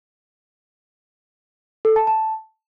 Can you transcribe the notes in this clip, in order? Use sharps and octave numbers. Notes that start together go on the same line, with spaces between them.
A4
A5
A5